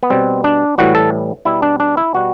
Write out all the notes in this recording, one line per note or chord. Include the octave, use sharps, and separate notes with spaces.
B3
B2 G3 C4
D4
A2 E3 G3 F#4
A4
B2 G3 E4
D4
D4
E4
B2 G3 F#4